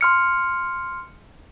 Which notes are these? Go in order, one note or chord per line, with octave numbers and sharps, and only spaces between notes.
C6 F6 C#7